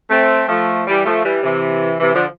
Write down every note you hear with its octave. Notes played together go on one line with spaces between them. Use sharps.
A3 C4
F3 A3
E3 G3
F3 A3
E3 G3
C3 E3
C3 E3
D3 F3